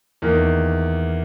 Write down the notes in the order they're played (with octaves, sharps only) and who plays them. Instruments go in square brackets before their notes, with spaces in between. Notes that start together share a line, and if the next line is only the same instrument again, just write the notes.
[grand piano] E2 D#3 A#3